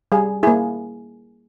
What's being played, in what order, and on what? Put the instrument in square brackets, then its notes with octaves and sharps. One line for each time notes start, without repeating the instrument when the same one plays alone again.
[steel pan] G3 G#4
A#3 E4 G#4